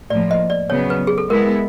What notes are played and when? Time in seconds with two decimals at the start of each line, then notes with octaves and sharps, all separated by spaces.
0.10 A2 F3 A#3 D5
0.31 D#5
0.50 D5
0.70 C#3 F#3 B3 C#5
0.90 B4
1.07 G#4
1.18 A4
1.29 G#3 B3 E4 A#4